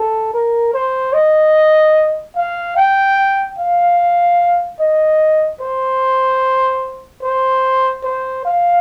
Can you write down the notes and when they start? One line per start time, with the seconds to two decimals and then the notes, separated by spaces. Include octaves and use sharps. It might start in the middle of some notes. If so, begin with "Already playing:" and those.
Already playing: A4
0.33 A#4
0.74 C5
1.14 D#5
2.36 F5
2.77 G5
3.58 F5
4.80 D#5
5.61 C5
7.23 C5
8.04 C5
8.45 F5